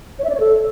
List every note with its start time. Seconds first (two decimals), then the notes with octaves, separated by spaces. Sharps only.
0.19 C#5
0.24 E5
0.30 D5
0.35 C#5
0.40 A4